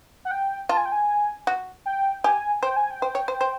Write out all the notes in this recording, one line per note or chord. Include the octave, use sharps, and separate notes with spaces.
F#5
G5
F4 A5
G#5
G5
G#5
F#4
G5
G4 G#5
C5 G5
G#5
G5
C5
C#5
C5
C5